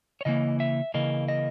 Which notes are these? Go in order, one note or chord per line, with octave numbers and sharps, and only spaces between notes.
C#5
C#3 E3 A#3 D#5
E5
C#3 E3 A#3 D#5
D#5